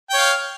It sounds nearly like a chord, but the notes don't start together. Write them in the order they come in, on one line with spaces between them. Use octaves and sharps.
G5 C#5 F5